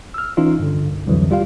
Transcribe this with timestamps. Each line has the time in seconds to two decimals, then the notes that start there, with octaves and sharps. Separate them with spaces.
0.14 E6 F6
0.37 E3 C#4 D#4 F4
0.59 G2 D3
0.90 C2
1.07 C2 F2 D3 E3 F#3
1.31 G3 F4 G4 F5